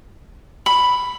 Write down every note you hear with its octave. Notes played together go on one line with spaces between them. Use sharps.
B5